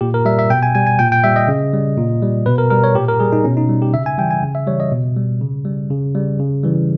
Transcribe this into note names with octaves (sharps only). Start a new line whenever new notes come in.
A#2 G4
A#4
G3 E5
E5
B2 G5
G#5
G3 G#5
G#5
A#2 G5
G5
G3 E5
D#5
C#3
G3
A#2
G3
B2 B4
A#4
G3 A#4
C#5
A#2 G4
A#4
G3 G#4
D#4
B2 C#4
D#4
G3
G4
C#3 E5
G#5
E3 G3 G5
G#5
C#3
E5
E3 G3 C#5
D#5
B2
G3
C#3
G3
C#3
G3
C#3
E3 G3